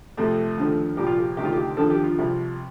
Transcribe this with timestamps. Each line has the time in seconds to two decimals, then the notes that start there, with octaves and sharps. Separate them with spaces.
0.17 F2 C3 F3 A3
0.58 D#2 D3 F3
0.97 C2 A#2 F3 G4
1.07 F4
1.17 G4
1.37 D2 C3 D#3 G4
1.45 F4
1.53 G4
1.77 D#2 D3 F3 A4
1.90 G4
2.04 F4
2.18 C2 C3 F3